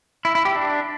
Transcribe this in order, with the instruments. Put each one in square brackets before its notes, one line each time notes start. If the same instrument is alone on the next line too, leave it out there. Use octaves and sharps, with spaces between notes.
[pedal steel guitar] E4
E4
G4
D4